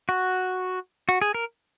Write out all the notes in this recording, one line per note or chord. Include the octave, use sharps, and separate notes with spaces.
F#4
F#4
G#4
A#4